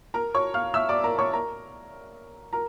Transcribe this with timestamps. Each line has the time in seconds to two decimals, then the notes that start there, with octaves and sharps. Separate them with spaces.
0.14 A#4 A#5
0.34 C#5 C#6
0.54 F5 F6
0.74 E5 E6
0.89 D5 D6
1.04 A#4 A#5
1.18 C#5 C#6
1.33 A#4 A#5
2.53 A#4 A#5